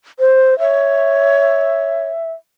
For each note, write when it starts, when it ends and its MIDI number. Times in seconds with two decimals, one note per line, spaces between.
0.20 0.58 72
0.59 2.08 73
0.59 2.32 76